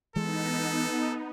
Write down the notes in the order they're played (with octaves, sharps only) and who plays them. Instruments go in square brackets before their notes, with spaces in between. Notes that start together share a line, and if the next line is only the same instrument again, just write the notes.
[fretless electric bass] E3 G#3 [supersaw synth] B3 D#4 [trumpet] A4